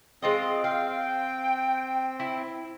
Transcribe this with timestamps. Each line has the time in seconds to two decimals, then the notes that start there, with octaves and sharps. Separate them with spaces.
0.22 G#3 C4 F4 D#5
0.64 F5 G5
2.20 E4